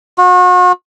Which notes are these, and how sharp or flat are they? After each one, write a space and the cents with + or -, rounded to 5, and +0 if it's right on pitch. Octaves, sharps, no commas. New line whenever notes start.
F#4 -40